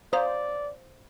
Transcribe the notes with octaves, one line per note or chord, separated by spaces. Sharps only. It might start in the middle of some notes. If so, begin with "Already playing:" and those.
C5 D5 F5 A#5 D#6